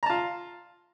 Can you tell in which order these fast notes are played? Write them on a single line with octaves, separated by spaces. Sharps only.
A#5 A5 F4